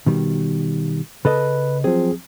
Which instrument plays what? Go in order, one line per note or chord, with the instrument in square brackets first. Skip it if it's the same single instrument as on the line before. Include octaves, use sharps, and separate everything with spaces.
[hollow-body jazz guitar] B2 D#3 G3
[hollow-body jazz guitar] C#3 A4 D#5 [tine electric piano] B4
[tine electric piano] F3 F#3 C4 [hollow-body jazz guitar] G#4